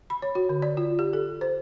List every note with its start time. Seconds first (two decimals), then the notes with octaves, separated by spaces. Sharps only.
0.10 B5
0.22 C#5
0.35 F#4
0.49 D3
0.62 D5
0.77 F4
0.99 G4
1.13 A4
1.41 C5